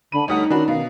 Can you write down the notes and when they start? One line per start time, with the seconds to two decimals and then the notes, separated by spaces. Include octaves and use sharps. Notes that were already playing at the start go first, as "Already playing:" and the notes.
0.12 D3 B5 D#7
0.28 D2 G3 D#4 A4 C#5 D#5 F#5 D#6
0.50 D#3 C#4 D4 F#4 A#4 B5
0.68 B2 F5